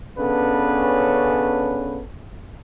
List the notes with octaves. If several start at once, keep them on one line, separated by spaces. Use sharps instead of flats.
C#3 B3 C#4 D4 A4 B4